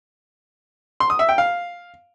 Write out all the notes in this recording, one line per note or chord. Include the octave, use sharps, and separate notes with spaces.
C6
D#6
E5
G5
F5